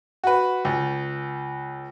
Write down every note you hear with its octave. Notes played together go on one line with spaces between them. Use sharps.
F#4 B4
C#2